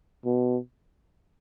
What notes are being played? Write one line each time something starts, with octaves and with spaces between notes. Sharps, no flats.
B2